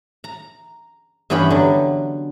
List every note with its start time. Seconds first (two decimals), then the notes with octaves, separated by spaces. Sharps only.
0.24 A#5
1.30 G2 E3 B3 C#4 G4 B5
1.50 D3 F#3